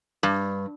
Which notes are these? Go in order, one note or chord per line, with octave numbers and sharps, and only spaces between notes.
G2